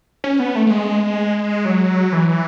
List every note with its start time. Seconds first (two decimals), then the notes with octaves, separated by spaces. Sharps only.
0.24 C#4
0.40 B3
0.56 A3
0.67 A3
0.71 G#3
1.65 F#3
2.13 E3